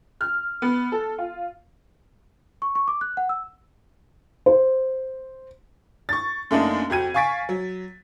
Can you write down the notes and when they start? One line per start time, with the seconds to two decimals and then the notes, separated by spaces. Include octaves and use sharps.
0.21 F6
0.62 B3
0.92 A4
1.18 F4
2.62 C#6
2.75 C#6
2.88 D6
3.01 F#6
3.17 F#5
3.29 E6
4.46 C5
6.09 C#6 A6
6.51 F#2 A3 A#3 D4 D#4
6.90 F2 F#4 G4 G#6 D#7
7.14 F5 G#5 C#6 A6 B6 D7
7.49 F#3